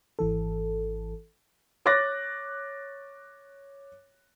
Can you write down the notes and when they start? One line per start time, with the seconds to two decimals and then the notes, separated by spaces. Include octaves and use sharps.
0.19 G#1 E3 A4
1.85 C#5 D6 F#6 A6 A#6